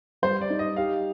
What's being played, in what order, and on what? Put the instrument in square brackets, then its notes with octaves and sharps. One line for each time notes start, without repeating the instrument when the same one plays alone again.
[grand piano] G3 [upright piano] C5
[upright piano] D5
[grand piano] D#4
[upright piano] D#5
[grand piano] G4 [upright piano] F5